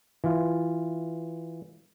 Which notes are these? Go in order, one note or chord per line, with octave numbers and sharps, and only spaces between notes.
E3 F4